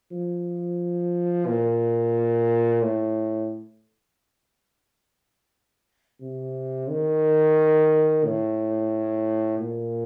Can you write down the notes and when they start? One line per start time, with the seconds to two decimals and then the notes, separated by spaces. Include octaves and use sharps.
0.11 F3
1.47 A#2
2.82 A2
6.21 C3
6.89 D#3
8.25 A2
9.60 A#2